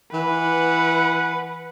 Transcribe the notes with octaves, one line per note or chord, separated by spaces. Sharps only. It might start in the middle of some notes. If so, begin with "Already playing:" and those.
E3 B4 F#5